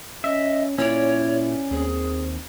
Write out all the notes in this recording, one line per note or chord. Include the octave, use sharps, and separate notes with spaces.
C#4 D#5 E5
A#2 C#4 E4 C#5 D5
D#2 C4 G#4